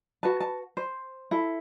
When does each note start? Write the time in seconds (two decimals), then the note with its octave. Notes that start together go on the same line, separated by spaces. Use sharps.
0.23 F#4 B4 A5
0.40 A5
0.77 C5
1.31 E4 A4